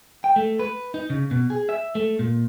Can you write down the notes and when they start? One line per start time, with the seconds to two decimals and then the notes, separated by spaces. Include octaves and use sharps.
0.24 G5
0.36 A3
0.59 B4
0.94 D#4
1.10 C#3
1.31 B2
1.50 G#4
1.69 E5
1.95 A3
2.19 A#2